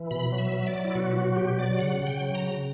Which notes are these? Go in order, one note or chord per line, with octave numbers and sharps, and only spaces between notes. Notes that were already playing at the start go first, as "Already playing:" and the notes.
Already playing: E3
B2 B5
F#3
E5
F#3
D5
F#3
E4
B2 F#4
E4
F#3 F#4
B2 G4
F#3 D5
C#3 F#5
C#3
G5
F#3
A#5
C#3